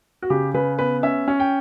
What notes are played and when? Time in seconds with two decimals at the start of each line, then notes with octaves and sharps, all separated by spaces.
0.22 F#4
0.30 C#3 G4
0.54 C#3 B4
0.79 B3 B4
1.03 C#4 E5
1.28 C#4
1.40 G5